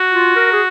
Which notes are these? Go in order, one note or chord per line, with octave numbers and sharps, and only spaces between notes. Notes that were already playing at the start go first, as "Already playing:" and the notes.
Already playing: F#4
F4
A#4
G#4